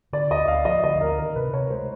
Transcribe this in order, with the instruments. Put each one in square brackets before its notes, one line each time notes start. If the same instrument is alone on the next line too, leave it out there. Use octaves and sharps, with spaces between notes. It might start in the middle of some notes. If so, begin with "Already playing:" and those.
[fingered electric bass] D3 [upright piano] D5
[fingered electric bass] D2 [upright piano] D#5
[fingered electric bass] D2 [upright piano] F5
[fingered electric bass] F3 [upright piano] D#5
[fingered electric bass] D3 [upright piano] D#5
[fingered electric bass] D2 [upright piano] A#4
[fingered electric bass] D#3 [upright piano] A#4
[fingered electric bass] C3 [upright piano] B4
[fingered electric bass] C3 [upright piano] C#5
[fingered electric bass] G#3 [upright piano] C5